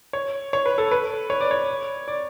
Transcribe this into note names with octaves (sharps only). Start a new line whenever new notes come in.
C#5
C#5
B4
A4
B4
C#5
D5
C#5
D5